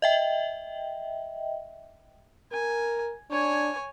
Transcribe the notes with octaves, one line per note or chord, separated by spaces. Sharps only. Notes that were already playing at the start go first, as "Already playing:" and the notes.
D#5 E5 G5
A#4 G#5
D4 C#5 G#5